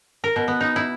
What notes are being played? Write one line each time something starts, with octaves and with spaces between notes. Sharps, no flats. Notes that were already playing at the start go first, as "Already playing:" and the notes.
A#4
B2
B3
D#4
E4